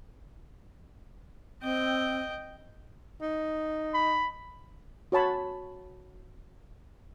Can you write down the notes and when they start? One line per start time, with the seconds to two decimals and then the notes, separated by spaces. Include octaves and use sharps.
1.62 C4 D#5 G5
3.21 D#4
3.94 B5
5.12 F#4 C#5 A5 B5